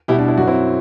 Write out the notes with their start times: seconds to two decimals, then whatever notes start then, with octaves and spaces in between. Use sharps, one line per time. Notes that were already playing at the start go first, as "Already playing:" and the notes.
0.08 B2 G3 E4 G4
0.18 D4
0.28 E4
0.38 F#2 F#3 F#4
0.47 C4 E4